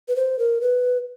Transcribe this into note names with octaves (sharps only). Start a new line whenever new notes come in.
B4
C5
A#4
B4